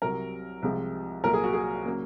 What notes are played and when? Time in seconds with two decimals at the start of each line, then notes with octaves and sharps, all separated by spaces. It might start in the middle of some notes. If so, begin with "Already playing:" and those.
0.02 C2 C3 F#3 A#4
0.63 C2 C3 F3 G#3
1.24 C2 A#2 F#3 A#3 A#4
1.34 G#4
1.44 F#4
1.53 G#4
1.85 C#3 F#3 A#3